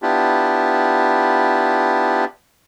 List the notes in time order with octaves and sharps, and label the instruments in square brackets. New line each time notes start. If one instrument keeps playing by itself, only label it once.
[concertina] B3 D4 E4 F4 G4